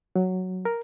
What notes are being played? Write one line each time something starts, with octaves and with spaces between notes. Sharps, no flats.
F#3
A#4